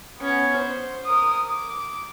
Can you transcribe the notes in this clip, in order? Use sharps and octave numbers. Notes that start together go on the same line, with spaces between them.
B3 C#4
C5
A#4 D#6
D6